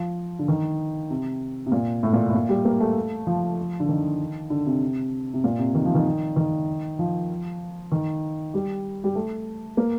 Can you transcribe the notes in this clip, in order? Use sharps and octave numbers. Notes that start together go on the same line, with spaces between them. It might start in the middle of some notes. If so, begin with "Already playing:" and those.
Already playing: F3
D3
D#3
C3
C3
A#2
A2
A#2
A2
A#2
G3
A#3
A3
F3
D3
D#3
D3
C3
C3
A#2
C3
D#3
F3
D#3
D#3
F3
D#3
G3
G3
A3
A#3